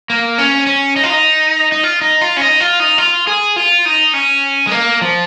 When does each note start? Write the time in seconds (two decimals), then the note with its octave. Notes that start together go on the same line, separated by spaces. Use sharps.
0.10 A#3
0.38 C#4
0.67 C#4
0.96 D#4
1.03 F4
1.10 D#4
1.72 D#4
1.83 F4
2.01 D#4
2.21 F4
2.37 C#4
2.41 D#4
2.61 F4
2.80 D#4
2.98 F4
3.27 G#4
3.56 F4
3.85 D#4
4.14 C#4
4.67 G#3
4.71 A#3
5.02 F3